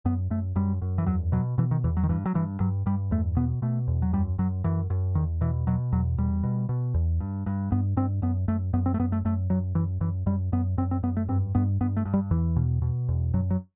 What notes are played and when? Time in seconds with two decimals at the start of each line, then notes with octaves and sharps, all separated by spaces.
0.05 F#2 B3
0.30 F#2 A3
0.56 F#2 G3
0.82 F#2
0.98 E3
1.06 E2 F#3
1.32 B2 F#3
1.58 B2 E3
1.71 D#3
1.84 E2 E3
1.97 F#3
2.03 D#3
2.09 G2 E3
2.26 F#3
2.34 G2 E3
2.60 G2 F#3
2.86 G2 G3
3.11 E2 A3
3.36 B2 B3
3.62 B2 A3
3.88 E2
4.02 F#3
4.13 F#2 G3
4.38 F#2 F#3
4.64 F#2 E3
4.90 F#2
5.15 E2 D#3
5.41 B2 E3
5.67 B2 F#3
5.92 E2 F#3
6.18 E2 G3
6.43 B2
6.69 B2
6.94 E2
7.20 G2
7.46 G2
7.72 G2 B3
7.97 G2 C4
8.22 F#2 B3
8.48 F#2 A3
8.73 F#2 B3
8.86 C4
8.94 A3
8.99 F#2 B3
9.12 A3
9.25 F#2 A3
9.50 F#2 F#3
9.75 F#2 E3
10.01 F#2 E3
10.26 F#2 G3
10.52 F#2 B3
10.78 F#2 C4
10.91 C4
11.03 F#2 B3
11.17 A3
11.28 G2 C4
11.55 G2 B3
11.81 G2 B3
11.97 A3
12.05 G2
12.14 G3
12.31 E2 E3
12.56 B2
12.82 B2
13.08 E2
13.34 F#2 F#3
13.50 F#3